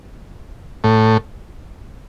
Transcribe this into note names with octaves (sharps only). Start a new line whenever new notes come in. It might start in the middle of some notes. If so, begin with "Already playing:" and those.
A2